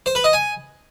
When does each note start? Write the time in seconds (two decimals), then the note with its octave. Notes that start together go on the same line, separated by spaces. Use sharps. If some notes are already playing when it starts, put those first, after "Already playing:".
0.06 C5
0.15 B4
0.24 D#5
0.33 G#5